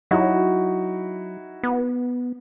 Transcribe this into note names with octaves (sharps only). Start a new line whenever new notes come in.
F#3 D#4 E4 F#4
B3